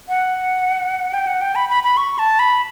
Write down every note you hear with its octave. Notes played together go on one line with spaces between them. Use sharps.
F#5
G5
F#5
G5
B5
B5
B5
C#6
A5
B5